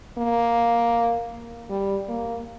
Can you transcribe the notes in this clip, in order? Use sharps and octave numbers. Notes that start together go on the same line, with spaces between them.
A#3
G3
A#3